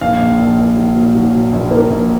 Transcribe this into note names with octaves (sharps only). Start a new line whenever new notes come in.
A#1 F5
A#1
A#1
A#1
F#3
A#2
F#3
A#2
A#1
A#3
A#1